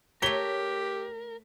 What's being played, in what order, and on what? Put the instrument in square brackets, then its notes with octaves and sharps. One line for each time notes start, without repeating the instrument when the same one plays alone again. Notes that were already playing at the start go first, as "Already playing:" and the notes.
[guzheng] A3 C#5 [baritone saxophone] G4 [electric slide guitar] A#4 [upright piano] B6 G7